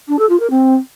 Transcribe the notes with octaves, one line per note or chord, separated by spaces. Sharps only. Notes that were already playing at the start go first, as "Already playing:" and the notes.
D4
A4
F4
A#4
C4